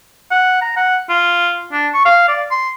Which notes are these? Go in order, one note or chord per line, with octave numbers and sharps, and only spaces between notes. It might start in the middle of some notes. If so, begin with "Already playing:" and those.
F#5
A#5
F#5
F4
D4
C#6
F5
D5
C6